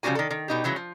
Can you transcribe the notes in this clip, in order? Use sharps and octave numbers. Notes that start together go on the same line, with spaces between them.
C#3 F3 G3 D4 F#4 G#5
D#3 A4
D#3
B2 D#4 G4
C#3 E3 F#3 G#3
F3